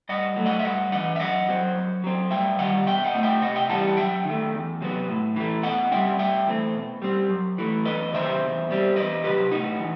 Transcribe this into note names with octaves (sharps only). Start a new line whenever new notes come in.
G2 D#5 F#5
F#3 A3
D#5 F#5
E5
G2 D#5 F#5
E3 G3 D#5 F#5
E5
F#2 D#5 F#5
F#3 C4
F#2
F#3 C4
G2 E5 G5
D#3 G3 D#5 F#5
B2 E5 G5
D#5 F#5
A3 C4
E5 G5
C3 D#5 F#5
E5 G5
E3 G3 C4 F#5 A5
F#5
F#2 E5 G5
D#3 A3
E2
C3 F#3 B3
A2
E3 A3
B2 D#5 F#5
G3 C4 E5 G5
G2 E5 G5
E3 A3 C4
B2
G3 C4
F#2
E3 A3
E2 B4 D#5
C3 D#3 F#3 C5 E5
E2
B2 G3 C4
E2 B4 D#5
C3 D#3 F#3 G4 B4
A2 D#4 F#4
E3